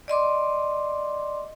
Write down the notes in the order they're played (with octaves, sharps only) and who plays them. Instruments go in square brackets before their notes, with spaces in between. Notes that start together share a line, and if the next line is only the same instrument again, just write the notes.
[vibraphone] D5 D#5 C6 D6